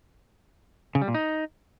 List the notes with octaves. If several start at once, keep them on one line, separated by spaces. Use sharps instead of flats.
C#3
G3
A#2
D#4